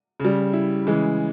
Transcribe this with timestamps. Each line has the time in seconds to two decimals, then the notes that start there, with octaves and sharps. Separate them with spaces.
0.20 C#3
0.25 G3
0.53 E4
0.86 C#3 E3 G#3